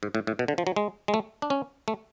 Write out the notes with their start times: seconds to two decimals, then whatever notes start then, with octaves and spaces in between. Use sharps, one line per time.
0.03 G#2
0.15 A2
0.27 A2
0.39 B2
0.48 D3
0.58 F3
0.67 F#3
0.76 G#3
1.08 G#3
1.14 A3
1.42 D4
1.50 C#4
1.88 A3